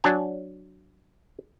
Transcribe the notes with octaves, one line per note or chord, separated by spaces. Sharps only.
F#3 D4 G#5